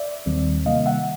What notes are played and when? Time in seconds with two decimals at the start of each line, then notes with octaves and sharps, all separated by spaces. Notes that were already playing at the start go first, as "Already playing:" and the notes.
Already playing: D5 E5
0.26 D#2 D#3 G3 C4
0.66 C3 D#3 G3 A#3 D#5 F5
0.86 E5 F#5